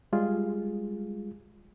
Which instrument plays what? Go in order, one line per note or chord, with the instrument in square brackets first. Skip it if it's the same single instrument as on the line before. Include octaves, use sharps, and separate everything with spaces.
[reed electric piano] G3 G#3 F4 G#4